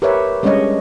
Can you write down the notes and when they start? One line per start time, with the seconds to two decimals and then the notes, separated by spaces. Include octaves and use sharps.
0.02 G4 A#4 B4 C#5 E5
0.43 G3 G#3 C#4 D4 C#5 D#5